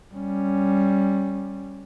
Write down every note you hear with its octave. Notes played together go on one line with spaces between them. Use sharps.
G3 C#4